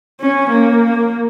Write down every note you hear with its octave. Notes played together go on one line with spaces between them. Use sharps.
C#4
A#3